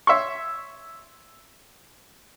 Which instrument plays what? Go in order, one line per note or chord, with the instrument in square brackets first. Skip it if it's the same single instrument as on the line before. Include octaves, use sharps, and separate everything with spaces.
[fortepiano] C#5 E5 C6 C#6